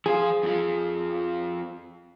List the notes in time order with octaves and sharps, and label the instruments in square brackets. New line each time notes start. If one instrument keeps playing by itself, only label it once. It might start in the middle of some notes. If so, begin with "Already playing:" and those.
[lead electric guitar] F3 F4 [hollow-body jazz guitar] G#4
[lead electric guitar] F2 F3